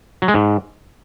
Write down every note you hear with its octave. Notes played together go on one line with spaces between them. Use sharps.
F#3
G#3
G#2